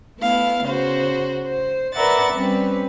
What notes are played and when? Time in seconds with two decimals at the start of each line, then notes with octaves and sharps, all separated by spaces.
0.19 A3 B3 E4 F5
0.65 C#3 F#4 C5
1.45 C5
1.93 A#4 B4 D5 E5 F#5 A6
2.33 G3 C4 C#4 B4